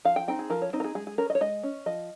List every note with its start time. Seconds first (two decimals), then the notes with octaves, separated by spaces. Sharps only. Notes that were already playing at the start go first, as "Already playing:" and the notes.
0.05 F3 F5
0.16 G5
0.28 C4 D#4 G5
0.39 G#4
0.50 F3 A#4
0.62 C#5
0.73 C4 D#4 C5
0.80 A#4
0.84 G#4
0.95 G#3 G#4
1.07 G#4
1.18 C#4 A#4
1.30 D#5
1.35 C#5
1.41 G#3 D#5
1.63 C#4
1.86 F3 D#5